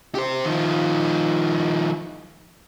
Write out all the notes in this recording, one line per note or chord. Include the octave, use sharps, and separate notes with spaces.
G4 C5
D#3 F3